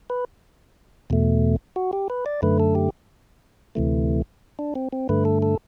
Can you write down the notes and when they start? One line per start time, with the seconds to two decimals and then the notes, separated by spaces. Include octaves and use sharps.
0.10 B4
1.10 E2 B2 A3
1.76 F#4
1.93 G4
2.10 B4
2.26 D5
2.42 F#2 D3 A3 B4
2.60 A4
2.75 G4
3.75 D2 C3 E3 A3
4.59 D4
4.75 C4
4.93 C4
5.09 G2 D3 A3 B4
5.25 A4
5.42 A4